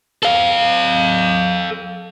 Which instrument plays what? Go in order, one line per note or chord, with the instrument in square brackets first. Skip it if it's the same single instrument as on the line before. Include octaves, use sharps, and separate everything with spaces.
[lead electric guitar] A4 F5